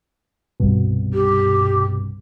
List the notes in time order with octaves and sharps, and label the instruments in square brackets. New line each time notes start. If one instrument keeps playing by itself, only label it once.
[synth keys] C2 G2 B2
[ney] G4